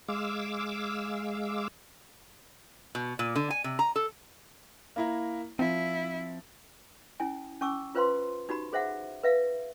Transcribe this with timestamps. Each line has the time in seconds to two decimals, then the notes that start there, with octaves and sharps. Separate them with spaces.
0.08 G#3 F5 D6 E6
2.95 B2
3.19 A#2
3.36 D3
3.50 G#5
3.64 C3
3.79 A#5
3.96 A4
4.96 A#3 E4 A#5
5.59 F3 C4 E4
7.20 C#4 E4 G#5
7.61 C#4 G#5 C#6 D6 E6
7.95 F4 B4 C5 F5 B5 C6
8.49 D#4 F#4 G4 B5
8.73 G#4 C5 E5 F#5
9.23 B4 E5 F5